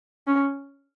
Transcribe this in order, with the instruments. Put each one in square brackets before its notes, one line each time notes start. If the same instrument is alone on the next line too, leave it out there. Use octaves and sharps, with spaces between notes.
[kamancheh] C#4